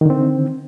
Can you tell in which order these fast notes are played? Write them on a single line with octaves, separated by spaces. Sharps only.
D#3 D3 C4